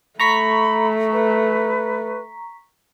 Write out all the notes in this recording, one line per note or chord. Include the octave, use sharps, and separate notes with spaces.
A3 A#5 B5 C#6 B6
B4